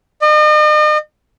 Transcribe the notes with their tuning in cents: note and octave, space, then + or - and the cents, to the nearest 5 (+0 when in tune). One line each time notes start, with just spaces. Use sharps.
D#5 -40